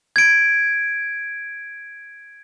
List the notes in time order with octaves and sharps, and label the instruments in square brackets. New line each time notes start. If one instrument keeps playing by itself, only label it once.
[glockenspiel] G#6 D7